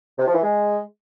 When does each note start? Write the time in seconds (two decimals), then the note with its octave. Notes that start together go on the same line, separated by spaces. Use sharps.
0.18 C3
0.27 F3
0.35 E3
0.43 G#3